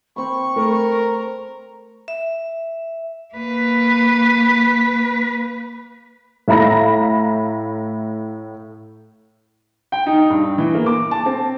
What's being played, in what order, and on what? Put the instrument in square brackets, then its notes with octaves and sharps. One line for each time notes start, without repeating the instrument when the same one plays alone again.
[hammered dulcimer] C4 B5 [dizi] C#6
[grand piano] A3 [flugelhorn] A#4
[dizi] A#5
[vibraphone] E5
[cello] A#3 B4
[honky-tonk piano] A2 E5 F5 A#5 B5 A#6
[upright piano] G5
D#4
G2
E3
A#3
D6
A5
C4